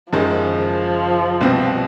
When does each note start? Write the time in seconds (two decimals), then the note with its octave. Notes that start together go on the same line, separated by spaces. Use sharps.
0.13 F#1 F#2 D#3 F3 G#3 C#4
1.41 C2 B2 G3 C4